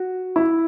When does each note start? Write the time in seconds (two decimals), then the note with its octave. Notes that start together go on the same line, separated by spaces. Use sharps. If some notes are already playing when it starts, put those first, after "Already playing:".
Already playing: F#4
0.36 E4